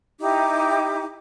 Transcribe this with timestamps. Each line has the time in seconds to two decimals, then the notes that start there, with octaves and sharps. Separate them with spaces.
0.20 D#4 E4 G4 D6